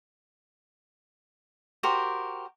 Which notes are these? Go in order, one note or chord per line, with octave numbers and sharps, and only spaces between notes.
F#4 G4 A#4 C5